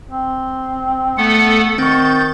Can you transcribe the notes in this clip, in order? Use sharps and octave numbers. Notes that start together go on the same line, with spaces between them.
C4
A3 B3 A4 F#5
D#3 C4 C#6 G6 A6